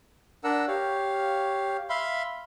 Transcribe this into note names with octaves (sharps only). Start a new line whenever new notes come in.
D4 A#4 F#5 E6
G4 C#5 F5
E5 F5 B5 C6